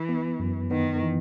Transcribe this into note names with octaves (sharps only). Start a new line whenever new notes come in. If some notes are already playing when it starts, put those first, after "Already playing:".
Already playing: E3
B3
F#2
D#3 B3
E3